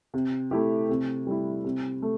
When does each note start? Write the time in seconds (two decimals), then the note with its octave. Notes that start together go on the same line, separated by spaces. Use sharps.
0.14 C3
0.51 A3 E4 G4
0.89 C3
1.27 G3 E4
1.64 C3
2.02 A3